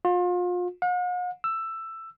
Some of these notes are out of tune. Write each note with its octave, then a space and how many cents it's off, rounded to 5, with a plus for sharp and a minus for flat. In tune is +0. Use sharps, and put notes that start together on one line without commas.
F4 +35
F#5 -45
E6 +10